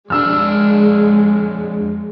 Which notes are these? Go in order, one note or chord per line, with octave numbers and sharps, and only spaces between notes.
F2 G#3 D4 E6 F6